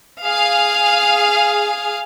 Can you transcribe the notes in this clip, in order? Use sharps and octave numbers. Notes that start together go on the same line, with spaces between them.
G#4 F5